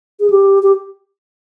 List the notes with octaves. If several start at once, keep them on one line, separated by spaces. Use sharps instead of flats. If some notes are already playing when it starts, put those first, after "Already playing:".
G#4
G4
G4